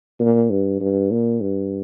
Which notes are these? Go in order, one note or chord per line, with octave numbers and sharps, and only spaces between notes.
A#2
G2
G2
A#2
G2